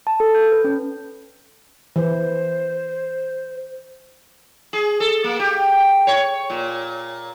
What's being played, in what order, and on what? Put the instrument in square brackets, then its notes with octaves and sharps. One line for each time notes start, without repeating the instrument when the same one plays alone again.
[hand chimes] A5
A4
G6
B4
C#4
[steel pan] E3 [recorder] C5
[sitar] G#4
A4
A#3
G4
C#5
A#2